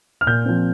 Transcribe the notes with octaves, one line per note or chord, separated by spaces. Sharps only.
F6
A#2 G6
F3 C4